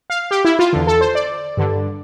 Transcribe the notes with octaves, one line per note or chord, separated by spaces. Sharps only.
F5
G4
E4
F4
E2 D3
A4
C5
D5
G2 D3